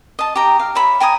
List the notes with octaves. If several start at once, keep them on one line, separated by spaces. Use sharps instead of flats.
D#5 A5
G4 G5 A#5
F5
C#5 E5 B5
G5 G#5 A#5 D#6